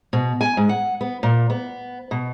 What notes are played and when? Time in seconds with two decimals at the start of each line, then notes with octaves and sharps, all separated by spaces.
0.13 B2
0.41 G#5
0.57 G#2
0.69 F#5
1.01 B3
1.23 A#2
1.50 B3
2.11 B2